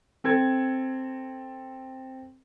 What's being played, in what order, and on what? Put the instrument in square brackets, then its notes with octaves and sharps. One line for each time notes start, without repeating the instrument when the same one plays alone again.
[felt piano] C4 A4 G#6